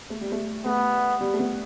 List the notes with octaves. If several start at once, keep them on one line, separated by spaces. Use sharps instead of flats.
A3
G3
A3
A3 B3
G3
A3
B3